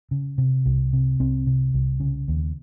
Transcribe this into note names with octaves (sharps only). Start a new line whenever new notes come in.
C#3
C3
C2
C3
C2 C4
C3
C2
C#3
D#2